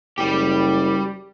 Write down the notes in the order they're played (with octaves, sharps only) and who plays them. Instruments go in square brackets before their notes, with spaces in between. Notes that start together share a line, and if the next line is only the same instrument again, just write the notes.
[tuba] F#1 [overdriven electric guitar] G3 G4